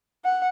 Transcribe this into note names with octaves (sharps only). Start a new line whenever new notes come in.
F#5